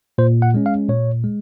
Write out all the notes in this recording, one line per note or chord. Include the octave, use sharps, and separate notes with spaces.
A#2 C5
F#5
G#3 C#4
F5
A#2 C#5
G#3